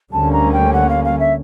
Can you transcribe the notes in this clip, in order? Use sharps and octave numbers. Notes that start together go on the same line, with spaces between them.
D2 D3 G3 A#3 C#4 A5
A#5
G5
F#5
F5
F5
E5